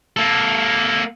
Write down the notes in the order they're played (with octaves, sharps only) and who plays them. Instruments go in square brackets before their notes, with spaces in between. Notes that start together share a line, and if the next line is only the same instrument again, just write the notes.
[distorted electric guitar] A#3 A4